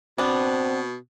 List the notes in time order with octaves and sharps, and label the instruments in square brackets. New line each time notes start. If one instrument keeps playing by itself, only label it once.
[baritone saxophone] B2 [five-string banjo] B3 D4 [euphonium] C4